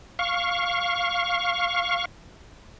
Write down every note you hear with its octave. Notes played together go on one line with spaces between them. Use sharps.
F5 C#6